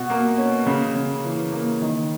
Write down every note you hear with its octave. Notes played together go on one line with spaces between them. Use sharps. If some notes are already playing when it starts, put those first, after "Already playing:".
Already playing: B2 F#4
A#3
C#4
C#3
C#3
E3
A#3
D#3